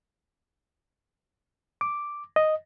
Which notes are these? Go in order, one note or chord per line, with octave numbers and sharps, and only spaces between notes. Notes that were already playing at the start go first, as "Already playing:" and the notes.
D6
D#5